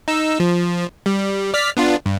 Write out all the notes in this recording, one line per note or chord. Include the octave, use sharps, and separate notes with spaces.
D#4 E6
F3
G3
D5 F6 B6
B3 D4 F4
G2